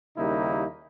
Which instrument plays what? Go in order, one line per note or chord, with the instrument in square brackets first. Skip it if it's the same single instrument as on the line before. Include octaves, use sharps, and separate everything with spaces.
[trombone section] D#2 C#3 G3 A#3 D#4 E4